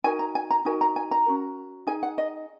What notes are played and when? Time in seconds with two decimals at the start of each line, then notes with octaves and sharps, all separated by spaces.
0.04 D#4 F#4 A#4 G#5
0.19 A#5
0.35 G#5
0.51 A#5
0.65 D#4 F#4 A#4 G#5
0.81 A#5
0.96 G#5
1.11 A#5
1.26 C#4 F#4 A#4
1.87 D#4 G#4 G#5
2.03 F#5
2.18 D#5